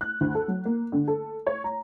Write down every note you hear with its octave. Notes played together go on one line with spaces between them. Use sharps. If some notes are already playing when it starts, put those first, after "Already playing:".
F#6
D2
A4
F#3
A#3
D3
A4
C#5
A#5